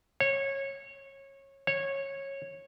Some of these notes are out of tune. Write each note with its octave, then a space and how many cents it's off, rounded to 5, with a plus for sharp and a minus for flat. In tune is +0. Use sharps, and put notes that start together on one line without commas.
C#5 -20
C#5 -15